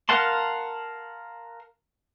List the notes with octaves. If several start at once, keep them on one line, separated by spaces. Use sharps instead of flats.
A#4 F5 F#5 A5 C6